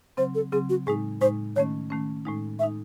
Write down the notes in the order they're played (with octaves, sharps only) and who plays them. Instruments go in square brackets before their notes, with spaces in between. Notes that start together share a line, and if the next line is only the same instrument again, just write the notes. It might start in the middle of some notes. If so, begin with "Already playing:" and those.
[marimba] C#3 F#3 C4 [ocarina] C5
[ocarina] A4
[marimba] C#3 F#3 C4 [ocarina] G#4
[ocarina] F#4
[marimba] A2 G#3 D#4 [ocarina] G#4
[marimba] A2 G#3 D#4 [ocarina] C5
[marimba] D#3 A3 C#4 [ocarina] C#5
[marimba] D#3 A3 C#4
A2 G#3 D#4
[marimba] A2 G#3 D#4 [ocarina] E5